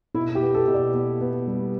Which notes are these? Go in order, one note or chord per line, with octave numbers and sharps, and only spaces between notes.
B2 E4
G4
B3
A4
B2
D5
B3
B3
G3